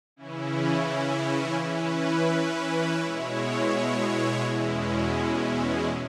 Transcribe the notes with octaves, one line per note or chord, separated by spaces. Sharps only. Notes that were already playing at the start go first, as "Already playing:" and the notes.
C#3 E3 C#4 E4
E3 C#4 E4 B4
B2 G#3 E4 C#5
E2 B2 G#3 C#4 E4